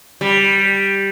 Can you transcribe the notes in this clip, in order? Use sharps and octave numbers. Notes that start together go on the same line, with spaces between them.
G3